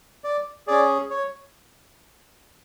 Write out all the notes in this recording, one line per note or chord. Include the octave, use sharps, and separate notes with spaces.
D5
C#4 G#4 D5
C#5